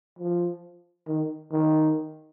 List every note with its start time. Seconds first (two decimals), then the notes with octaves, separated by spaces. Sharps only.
0.19 F3
1.07 D#3
1.52 D#3